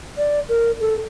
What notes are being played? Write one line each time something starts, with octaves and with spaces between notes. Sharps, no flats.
D5
A#4
A4